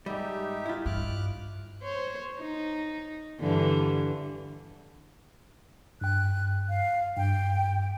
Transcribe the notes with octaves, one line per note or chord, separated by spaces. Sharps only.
G#2 G3 D#4 G4 E5
E4 F4
G2 D6 F6 F#6
C5 C#5
D#4
G2 D3 E3
G2 G5 F#6
F5
G2 G5